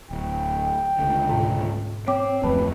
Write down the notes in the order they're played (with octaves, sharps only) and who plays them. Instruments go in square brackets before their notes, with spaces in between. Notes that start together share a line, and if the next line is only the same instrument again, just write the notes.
[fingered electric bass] D1 [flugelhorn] G5
[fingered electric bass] C#2 D3
[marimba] G#2 B2
[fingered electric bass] C4 [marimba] C#5 G5 D6
[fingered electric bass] D1 F2 A2 [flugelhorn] B4 [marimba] A5